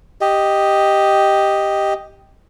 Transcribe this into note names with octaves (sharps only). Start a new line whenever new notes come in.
G4 D#5